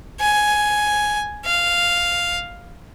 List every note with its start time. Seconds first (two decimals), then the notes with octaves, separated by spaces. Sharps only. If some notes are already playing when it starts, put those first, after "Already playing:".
0.21 G#5
1.45 F5